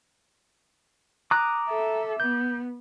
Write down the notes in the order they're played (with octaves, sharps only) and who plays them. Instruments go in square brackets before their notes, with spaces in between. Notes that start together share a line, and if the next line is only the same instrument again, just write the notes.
[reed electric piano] A#5 [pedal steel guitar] D6 D#6 F#6
[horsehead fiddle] A4 E5
[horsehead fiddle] B3 [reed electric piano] G6